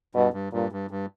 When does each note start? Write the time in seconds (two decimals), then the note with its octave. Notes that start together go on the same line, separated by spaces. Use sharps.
0.15 G2 B2
0.33 G2
0.52 G2 A#2
0.72 G2
0.91 G2